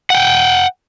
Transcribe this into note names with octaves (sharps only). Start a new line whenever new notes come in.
F#5 G5